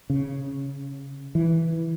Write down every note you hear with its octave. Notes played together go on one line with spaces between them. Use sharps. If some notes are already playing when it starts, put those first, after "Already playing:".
C#3
E3